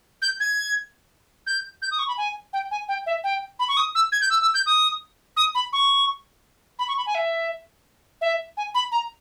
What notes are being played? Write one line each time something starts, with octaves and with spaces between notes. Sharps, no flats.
G6
G#6
G6
G6
D#6
C#6
B5
G#5
G5
G#5
G5
E5
G5
B5
C#6
D#6
E6
G#6
G6
E6
E6
G6
D#6
D#6
B5
C#6
B5
C#6
B5
G#5
E5
E5
G#5
B5
A#5